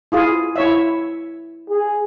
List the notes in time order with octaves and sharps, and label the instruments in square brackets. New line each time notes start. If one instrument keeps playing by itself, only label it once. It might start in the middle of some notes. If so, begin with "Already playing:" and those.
[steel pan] E4 F4 G#4
E4 C#5 E5
[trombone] G#4